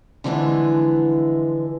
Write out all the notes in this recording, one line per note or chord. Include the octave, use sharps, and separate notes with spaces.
D3 E3 F3 G#3 E4 B4